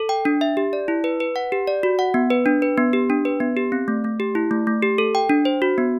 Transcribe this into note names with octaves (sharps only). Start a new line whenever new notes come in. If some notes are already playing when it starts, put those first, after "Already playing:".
Already playing: A4
G5
D4
E5
G4
D5
E4
B4
B4
F#5
G4
D5
F#4
F#5
B3
B4
D4
B4
B3
G4
D4
B4
B3
G4
C4
A3
A3
G4
E4
A3
A3
G4
A4
G5
D4
C5
F#4
B3